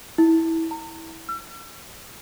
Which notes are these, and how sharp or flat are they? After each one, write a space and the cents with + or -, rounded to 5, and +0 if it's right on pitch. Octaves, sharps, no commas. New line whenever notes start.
E4 -15
A#5 -40
E6 +45